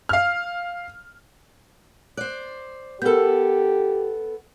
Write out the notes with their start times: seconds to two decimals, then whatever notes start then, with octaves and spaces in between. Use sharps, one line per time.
0.09 F5 F6
2.17 C5 D5 F#6
3.02 B3 G4 A4 A#4 G6